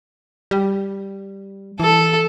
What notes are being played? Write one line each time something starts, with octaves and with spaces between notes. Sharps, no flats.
G3
E3 A4